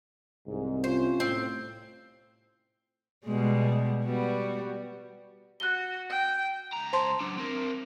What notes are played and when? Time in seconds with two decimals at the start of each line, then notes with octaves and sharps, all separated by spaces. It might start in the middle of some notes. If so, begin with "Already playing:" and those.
0.47 C2 G#2
0.84 C3 C#4 F4 C5
1.20 A2 C4
3.25 B2 G3 G#3
4.05 G3 B3 F#4
5.60 F#4 F#6 G7
6.10 G5
6.73 C#2 A#5
6.93 C5 A5 C6
7.21 F#3 D4
7.38 C4 A#4